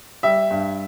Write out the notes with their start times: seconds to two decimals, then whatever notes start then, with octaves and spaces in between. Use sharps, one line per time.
0.23 G3 E5
0.51 G2